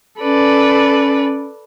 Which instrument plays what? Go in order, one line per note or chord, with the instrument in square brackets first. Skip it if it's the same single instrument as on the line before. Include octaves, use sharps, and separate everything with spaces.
[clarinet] C#4 [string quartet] A4 B4 D5